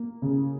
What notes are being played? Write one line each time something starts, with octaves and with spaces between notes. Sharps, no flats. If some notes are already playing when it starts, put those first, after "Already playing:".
Already playing: A#3
C#3